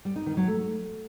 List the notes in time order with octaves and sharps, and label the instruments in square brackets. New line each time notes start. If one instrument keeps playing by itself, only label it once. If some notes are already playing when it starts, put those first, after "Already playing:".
[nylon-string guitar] G3
D#4
D#3
F#3
A3